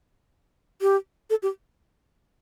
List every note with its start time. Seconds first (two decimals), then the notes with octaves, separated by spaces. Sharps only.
0.81 G4
1.30 A4
1.42 G4